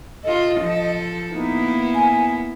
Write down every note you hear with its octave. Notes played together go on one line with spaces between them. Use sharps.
F4 A4 D#5
F3 A4
A#3 B3 D#4 E4
G#5